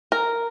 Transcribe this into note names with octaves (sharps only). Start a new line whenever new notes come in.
A#4